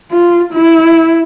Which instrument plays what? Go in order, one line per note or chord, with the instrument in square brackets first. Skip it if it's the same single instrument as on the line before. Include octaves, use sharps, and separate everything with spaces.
[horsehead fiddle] F4
E4